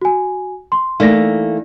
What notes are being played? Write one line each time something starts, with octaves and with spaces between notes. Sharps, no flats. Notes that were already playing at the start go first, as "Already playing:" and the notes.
F#4 G#5
C6
E3 A3 A#3 D#4 D5 A#6